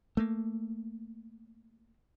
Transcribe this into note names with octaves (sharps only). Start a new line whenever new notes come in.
A3 A#3